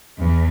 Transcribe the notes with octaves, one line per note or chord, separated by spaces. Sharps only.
E2